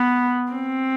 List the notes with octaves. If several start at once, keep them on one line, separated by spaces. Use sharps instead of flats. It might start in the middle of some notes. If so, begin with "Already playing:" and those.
Already playing: B3
C4